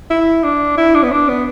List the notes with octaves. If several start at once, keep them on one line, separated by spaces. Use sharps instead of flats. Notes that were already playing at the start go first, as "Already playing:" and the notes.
E4
D4
E4
D4
B3
D4
B3